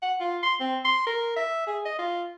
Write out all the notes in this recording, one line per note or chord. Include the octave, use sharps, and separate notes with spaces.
F#5
F4
C6
C4
C6
A#4
E5
G#4
D#5
F4